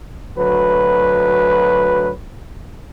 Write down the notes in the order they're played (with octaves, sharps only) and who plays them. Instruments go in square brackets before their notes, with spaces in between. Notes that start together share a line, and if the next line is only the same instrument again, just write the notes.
[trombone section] D2 F#3 B4